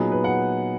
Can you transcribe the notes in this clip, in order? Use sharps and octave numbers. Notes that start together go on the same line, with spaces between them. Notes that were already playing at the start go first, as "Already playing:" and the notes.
Already playing: A#2 F#3 B3 D#4 G#4
B4
F#5